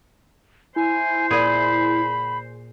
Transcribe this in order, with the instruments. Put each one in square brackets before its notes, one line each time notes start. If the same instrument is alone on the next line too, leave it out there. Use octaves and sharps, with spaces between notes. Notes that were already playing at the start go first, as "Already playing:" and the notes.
[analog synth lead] E4 [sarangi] C5 [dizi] G#5
[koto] A#2 G#4 [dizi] B5